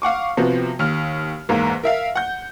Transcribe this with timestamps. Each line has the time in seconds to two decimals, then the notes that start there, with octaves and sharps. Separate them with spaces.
0.02 F5 F#5 C#6 D6
0.37 C3 F3 B3 F#4
0.79 D#2 F6
1.49 E2 G#2 A#3
1.84 A#4 E5 F5
2.15 F#5 G6